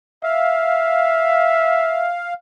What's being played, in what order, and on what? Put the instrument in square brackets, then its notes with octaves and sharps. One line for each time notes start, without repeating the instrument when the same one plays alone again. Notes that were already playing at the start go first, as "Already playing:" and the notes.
[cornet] E5 [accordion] F5